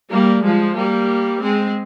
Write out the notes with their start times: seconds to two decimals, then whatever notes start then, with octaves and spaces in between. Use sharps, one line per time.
0.09 G3 A#3
0.42 F3 G#3
0.76 G3 A#3
1.41 G#3 C4